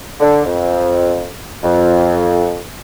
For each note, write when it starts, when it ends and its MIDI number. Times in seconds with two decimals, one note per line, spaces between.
0.20 0.42 50
0.45 1.28 41
1.64 2.61 41